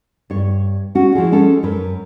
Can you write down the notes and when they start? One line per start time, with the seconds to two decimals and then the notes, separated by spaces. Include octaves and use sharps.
0.30 G2 C#5
0.95 C#4 F#4
1.15 F3 E4 G#4
1.32 G#3 C#4 A4
1.63 F#2 A#4 B4